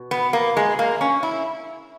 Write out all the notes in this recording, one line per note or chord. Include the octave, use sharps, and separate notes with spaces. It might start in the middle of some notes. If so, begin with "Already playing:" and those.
Already playing: B2
B3
A#3
G#3
A#3
C#4
E4